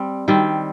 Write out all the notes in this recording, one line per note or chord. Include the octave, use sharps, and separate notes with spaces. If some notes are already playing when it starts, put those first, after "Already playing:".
Already playing: G3 C4
D#3 G3 C4